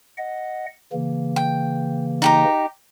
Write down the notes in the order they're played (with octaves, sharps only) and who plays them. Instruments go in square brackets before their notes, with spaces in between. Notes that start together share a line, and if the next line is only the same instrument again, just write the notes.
[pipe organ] D#5 F#5
C#3 E3 A#3
[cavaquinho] G5
D#4 G4 A#5